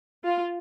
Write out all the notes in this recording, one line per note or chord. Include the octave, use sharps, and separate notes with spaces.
F4